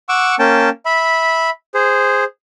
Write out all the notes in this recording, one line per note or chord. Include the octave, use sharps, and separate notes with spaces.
F#5 C#6 D6 E6
A#3 C#4 G5 A5
E5 B5
G#4 C5